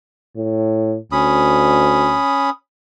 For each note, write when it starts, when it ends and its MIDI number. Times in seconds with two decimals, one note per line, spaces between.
0.36 0.97 45
1.12 2.19 38
1.12 2.50 61
1.12 2.50 83
1.12 2.50 87